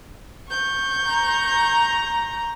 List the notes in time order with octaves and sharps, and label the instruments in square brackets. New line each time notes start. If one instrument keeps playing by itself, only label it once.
[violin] C#6 G6
[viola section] A#5